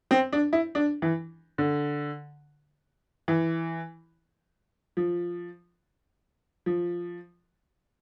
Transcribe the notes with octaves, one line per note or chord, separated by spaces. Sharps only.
C4
D4
E4
D4
E3
D3
E3
F3
F3